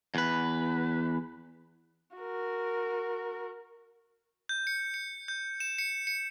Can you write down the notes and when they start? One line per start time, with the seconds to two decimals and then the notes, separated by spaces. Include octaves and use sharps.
0.15 E2 B4
2.17 F#4 A#4
4.49 G6
4.67 C#7
4.94 C#7
5.28 G6
5.60 E7
5.79 C#7
6.07 C#7